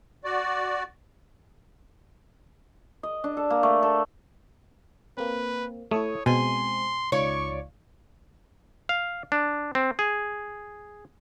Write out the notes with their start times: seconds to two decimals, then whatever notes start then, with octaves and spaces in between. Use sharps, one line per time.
0.24 F#4 D5
3.03 D#5
3.24 D4
3.37 A4
3.50 A#3
3.63 A3
3.83 A4
5.18 A#3 C4 B4
5.91 A3 E4 A4 C#5 D#6
6.26 B2 G#3 C4 G#5 C6
7.12 C#2 D#4 F4 C#5 D5 C#6
8.89 F5
9.32 D4
9.75 C4
9.99 G#4